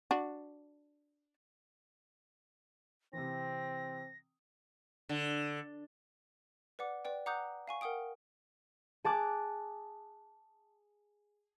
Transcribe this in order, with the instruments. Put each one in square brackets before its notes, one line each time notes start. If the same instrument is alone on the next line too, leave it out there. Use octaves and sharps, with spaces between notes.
[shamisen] D4 F#4
[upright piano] C3 E3 [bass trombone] C4 [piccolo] A#6
[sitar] D3
[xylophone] B4 D5 F#5 D6
B4 D5 G5
F#5 A#5 D6 D#6 F#6 G6
F5 G#5 C#6
A#4 F#5 G5 D#6 D7
[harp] G#4 A5 D6 F#6